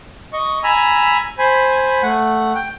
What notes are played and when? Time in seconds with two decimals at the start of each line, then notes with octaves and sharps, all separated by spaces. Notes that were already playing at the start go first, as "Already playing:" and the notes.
0.33 D#5 C#6
0.64 G#5 A#5 B5 E6
1.38 C5 G#5 B5
2.03 A3 F#5
2.55 G5